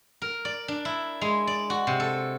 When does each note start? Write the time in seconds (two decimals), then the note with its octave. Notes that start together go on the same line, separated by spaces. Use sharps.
0.22 A#4
0.45 D5
0.68 D4
0.85 E4
1.21 G#3
1.47 D5
1.70 F#4
1.87 C3
2.00 A4